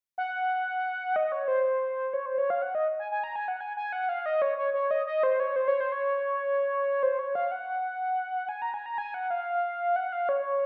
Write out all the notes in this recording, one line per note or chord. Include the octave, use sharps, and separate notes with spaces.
F#5
D#5
C#5
C5
C#5
C5
C#5
F5
F#5
D#5
G#5
G#5
A#5
G#5
F#5
G#5
G#5
F#5
F5
D#5
C#5
C#5
C#5
D#5
D#5
C5
C#5
C5
C#5
C5
C#5
C5
C#5
F5
F#5
G#5
A#5
G#5
A#5
G#5
F#5
F5
F#5
F5
C#5